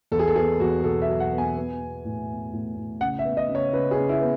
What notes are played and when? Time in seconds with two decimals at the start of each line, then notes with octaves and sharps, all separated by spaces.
0.12 E2 A4
0.19 G#4
0.28 A4
0.36 B3 G#4
0.60 E2 F#4
0.84 B2 A4
1.02 E5
1.08 F#3
1.20 F#5
1.33 B3
1.38 G#5
1.56 B3
1.80 B3
2.05 A2
2.29 B3
2.53 A2
2.77 A2
3.01 C#3 F#5
3.19 E5
3.25 B3
3.37 D#5
3.49 C#3
3.55 C#5
3.73 C#3 B4
3.91 G#4
3.97 C#3
4.09 E4
4.21 B3